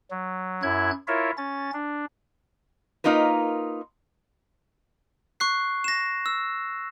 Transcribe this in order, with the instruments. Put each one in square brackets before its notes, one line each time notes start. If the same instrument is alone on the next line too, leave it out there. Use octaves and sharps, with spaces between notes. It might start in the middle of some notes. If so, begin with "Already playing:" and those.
[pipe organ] F#3
F#2 E4 F#6 G#6
E4 F4 A#4 C#5 E5
C#4 A6
D4
[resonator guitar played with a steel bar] A#3 D#4 F4 A#4 B4
[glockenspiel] C#6 F#6 C7
A#6 E7
E6